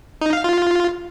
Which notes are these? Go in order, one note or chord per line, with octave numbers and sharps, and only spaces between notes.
D#4
F5
F4